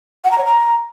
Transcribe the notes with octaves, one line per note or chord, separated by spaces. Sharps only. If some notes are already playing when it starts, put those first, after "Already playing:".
F#5
A#5
C#5
A#5